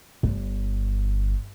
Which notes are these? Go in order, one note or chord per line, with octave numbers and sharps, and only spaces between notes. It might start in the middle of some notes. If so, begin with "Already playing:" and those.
G1